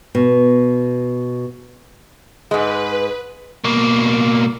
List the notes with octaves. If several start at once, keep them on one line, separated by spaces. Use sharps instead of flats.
B2
G#2 G#3 B4
B2 A#3